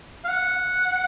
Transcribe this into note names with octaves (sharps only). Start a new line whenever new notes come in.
F5
F#5